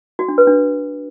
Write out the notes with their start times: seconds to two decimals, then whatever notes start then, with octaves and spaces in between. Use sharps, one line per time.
0.19 F#4
0.28 D4
0.38 B4
0.47 D4